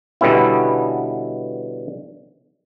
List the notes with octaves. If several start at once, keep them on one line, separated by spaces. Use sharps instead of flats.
B2 D3 G3 B3 C#4 E4